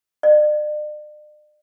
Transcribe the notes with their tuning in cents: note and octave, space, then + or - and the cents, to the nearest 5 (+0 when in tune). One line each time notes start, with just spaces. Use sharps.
D5 +40